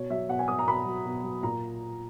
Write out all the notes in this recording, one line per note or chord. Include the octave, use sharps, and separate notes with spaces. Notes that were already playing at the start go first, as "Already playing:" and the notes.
Already playing: B2 C#5
F#3 E5
B2 F#5
G#5
F#3 D#6
A#5
B2 B5
F#3
B2
F#3
A#2 A#5